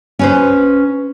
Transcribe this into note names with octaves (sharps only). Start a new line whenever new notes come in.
C#4 B4 C5